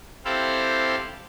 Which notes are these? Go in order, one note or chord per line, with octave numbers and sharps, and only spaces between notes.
C4 E4 G4 A4 C5 F5